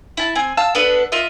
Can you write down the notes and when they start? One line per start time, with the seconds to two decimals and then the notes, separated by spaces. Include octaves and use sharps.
0.17 E4 A5
0.35 C4 G#5
0.57 F5 A5 E6
0.75 B3 D4 A4 B4
1.12 F4 A#4 D#5 E5